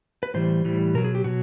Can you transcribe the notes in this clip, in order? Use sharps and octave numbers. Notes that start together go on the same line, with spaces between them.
B4
A2 E3 G3 C5
A2 E3 G3
B2 F#3 A#4
G#4
G4
B2 F#3 F#4